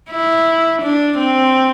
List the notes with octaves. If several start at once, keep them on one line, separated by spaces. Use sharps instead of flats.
E4
D4
C4